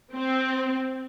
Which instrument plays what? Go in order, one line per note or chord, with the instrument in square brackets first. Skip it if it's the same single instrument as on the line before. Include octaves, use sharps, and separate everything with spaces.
[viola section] C4